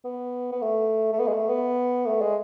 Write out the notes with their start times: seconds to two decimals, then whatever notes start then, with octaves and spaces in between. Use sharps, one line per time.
0.04 B3
0.52 B3
0.62 A3
1.13 A3
1.19 B3
1.28 G#3
1.34 A3
1.49 B3
2.06 A3
2.21 G#3